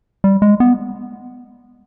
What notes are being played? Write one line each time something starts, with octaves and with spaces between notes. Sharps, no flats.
G3
G#3
B3